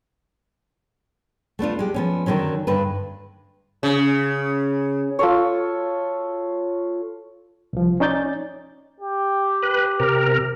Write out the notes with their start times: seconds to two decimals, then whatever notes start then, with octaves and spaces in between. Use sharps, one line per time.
1.59 A3 B3 D4 F4
1.79 G#3 G4
1.94 F3 B3 C#4
2.26 D3 D#3 F#3 C#4
2.67 G2 D3 B4
3.83 C#3
5.19 F4 A4 C#5
7.73 C2 F3
8.00 C#4 D#4 D5 G6 A6
9.01 G4
9.63 B4
10.00 C3 A#4